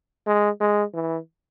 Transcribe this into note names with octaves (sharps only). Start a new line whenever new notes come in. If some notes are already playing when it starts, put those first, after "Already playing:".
G#3
G#3
E3